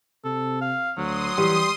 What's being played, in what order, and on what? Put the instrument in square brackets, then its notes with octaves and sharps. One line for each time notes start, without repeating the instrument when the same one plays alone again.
[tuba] C3 [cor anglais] A4
[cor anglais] F5
[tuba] D2 [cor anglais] F#3 [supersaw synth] C6 D#6
[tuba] E3 [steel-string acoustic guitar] G3